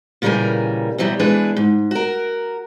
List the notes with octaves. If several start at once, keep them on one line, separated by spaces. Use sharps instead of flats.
A#2 C#3 E3 G3 A#4 G#5
B2 E3 F#3 G3
B2 E3 G#3 D4 G#4 B4
G#2
F#4 A#4